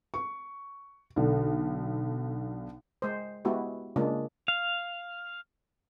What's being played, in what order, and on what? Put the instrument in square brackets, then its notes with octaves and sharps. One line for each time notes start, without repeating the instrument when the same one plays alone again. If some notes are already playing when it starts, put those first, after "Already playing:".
[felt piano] C#6
B1 D3
[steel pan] G#3 C5
G#3 B3 E4 F#4 G4
C#3 G#3 A#3 D4 F4
[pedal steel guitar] F5